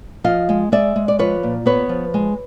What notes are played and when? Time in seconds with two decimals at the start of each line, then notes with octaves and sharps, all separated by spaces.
0.24 F3 D#5 F5
0.49 G#3
0.72 G#3 D5 E5
0.96 G#3
1.08 D5
1.19 F3 B4 C#5
1.43 A#2
1.66 B3 B4 C#5
1.89 F3
2.14 G#3